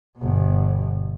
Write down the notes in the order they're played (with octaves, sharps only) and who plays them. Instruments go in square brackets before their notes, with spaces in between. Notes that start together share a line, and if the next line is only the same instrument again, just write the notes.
[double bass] G1 B2